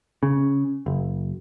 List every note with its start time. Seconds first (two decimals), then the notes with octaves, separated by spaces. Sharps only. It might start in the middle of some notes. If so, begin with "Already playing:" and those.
0.23 C#3
0.86 F#1